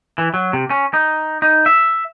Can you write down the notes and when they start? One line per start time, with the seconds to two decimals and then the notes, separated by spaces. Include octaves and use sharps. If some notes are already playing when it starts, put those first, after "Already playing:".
0.18 E3
0.34 F#3
0.53 C3
0.70 C#4
0.94 D#4
1.42 D#4
1.66 E5